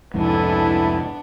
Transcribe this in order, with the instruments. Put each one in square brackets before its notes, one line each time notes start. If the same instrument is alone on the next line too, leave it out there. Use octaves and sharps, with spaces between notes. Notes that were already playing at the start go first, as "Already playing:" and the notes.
[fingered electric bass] C2 F2 G#2 [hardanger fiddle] B3 D4 [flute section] E4 A4 G#5